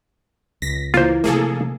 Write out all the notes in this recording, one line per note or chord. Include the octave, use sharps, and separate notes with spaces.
C#2 A#6 B6
E3 A#3 F4 C5
C3 F3 A3 A#3 G#4 A4